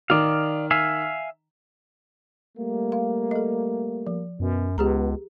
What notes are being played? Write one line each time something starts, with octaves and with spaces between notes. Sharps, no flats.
D#3 D5 F5
E5 F5 G#5
G3 A3 A#3
F5
A4 D#5
F3
F#2 B2
C#2 C#3 G#3 B3 G4 G#4 A#5